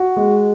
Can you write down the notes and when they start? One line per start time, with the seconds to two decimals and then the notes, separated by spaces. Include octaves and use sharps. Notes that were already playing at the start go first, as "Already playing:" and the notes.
Already playing: F#4
0.17 G#3